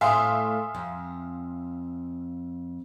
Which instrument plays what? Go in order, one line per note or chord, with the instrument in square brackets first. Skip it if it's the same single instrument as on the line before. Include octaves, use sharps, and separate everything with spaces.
[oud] A2 A3 [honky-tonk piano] E5 F5 C6 [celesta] G#5 D#6
[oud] F2